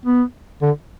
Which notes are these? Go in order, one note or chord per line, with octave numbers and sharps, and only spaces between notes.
B3
D3